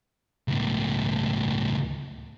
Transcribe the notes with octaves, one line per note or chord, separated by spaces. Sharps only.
C#2 A2